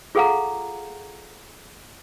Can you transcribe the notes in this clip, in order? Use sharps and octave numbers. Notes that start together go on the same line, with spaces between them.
F4 G#4 A4 F5 F#5 A#5